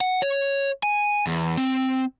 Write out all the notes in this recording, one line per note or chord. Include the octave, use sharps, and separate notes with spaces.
F#5
C#5
G#5
E2
C4